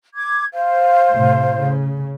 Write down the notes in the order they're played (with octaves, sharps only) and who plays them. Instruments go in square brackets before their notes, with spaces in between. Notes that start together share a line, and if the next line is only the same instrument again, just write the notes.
[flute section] D6 G#6
[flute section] C5 [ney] F5
[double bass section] A2 C3
C#3